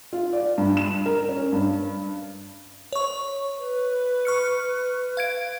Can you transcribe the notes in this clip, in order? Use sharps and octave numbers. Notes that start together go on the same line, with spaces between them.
F4
D5
G2
E7
A#4
C#4
G2
C#5 C#6
B4
C#6 F6 C#7
F5 G#6 D7